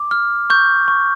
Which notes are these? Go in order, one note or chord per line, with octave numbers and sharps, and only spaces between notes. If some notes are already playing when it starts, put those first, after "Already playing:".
Already playing: D6
F6
C#6 G6
C#6